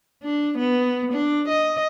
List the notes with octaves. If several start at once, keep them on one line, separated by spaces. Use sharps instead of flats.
D4
B3
D4
D#5